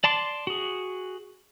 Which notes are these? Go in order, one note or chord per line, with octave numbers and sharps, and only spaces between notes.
D5 A5 C6 D6
F#4 G#4